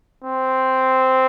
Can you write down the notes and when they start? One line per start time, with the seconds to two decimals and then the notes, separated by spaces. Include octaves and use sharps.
0.24 C4